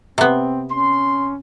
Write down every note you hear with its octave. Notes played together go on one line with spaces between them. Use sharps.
C3 B3 C4
C#4 C6